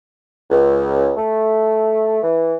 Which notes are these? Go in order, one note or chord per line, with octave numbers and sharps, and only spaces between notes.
C#2
A3
E3